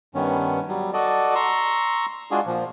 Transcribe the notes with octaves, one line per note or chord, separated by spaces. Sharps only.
G2 D#3 B3 C#4
F#3 G3
F#4 A4 D5 D#5
A#5 C6 C#6 E6
G#3 D4 F4 F#4 G#4
A#2 F3